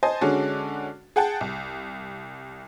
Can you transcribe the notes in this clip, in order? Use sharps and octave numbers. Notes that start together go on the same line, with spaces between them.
C5 D#5 G#5 A5
D3 G#3 C#4 D4 F#4
G#4 F#5 G5 A5
C2